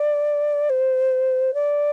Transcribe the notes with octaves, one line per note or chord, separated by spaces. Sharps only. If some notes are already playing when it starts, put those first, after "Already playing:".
Already playing: D5
C5
D5